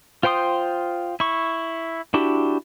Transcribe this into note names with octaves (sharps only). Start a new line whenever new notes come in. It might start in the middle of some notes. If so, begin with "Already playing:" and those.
F4 C5 G5 C6 D#6
E4 C#6
D4 E4 F#4 G4